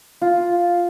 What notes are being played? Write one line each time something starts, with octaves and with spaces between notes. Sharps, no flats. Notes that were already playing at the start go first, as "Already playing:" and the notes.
F4